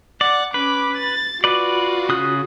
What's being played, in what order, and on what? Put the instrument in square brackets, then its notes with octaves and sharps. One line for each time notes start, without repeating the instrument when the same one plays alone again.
[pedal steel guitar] D5 [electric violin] F#5
[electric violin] C#4 D6 [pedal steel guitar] B4
[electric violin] A6
[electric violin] F4 F#4 [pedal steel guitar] B4 D5
[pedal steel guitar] C#3 D#6 F#6